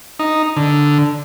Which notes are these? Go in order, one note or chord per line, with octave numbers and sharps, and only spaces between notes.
D#4
D3